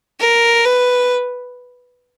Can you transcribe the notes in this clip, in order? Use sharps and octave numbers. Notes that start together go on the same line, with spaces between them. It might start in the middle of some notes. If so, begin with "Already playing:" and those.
A#4
B4